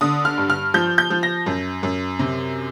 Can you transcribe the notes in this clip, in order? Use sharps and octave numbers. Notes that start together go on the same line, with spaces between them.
D3 D#6
F6
G2
F6
F3 G6
G6
F3
A#6
F#2
F#2
C3